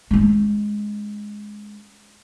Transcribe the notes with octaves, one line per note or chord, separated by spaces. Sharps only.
G#3 C#4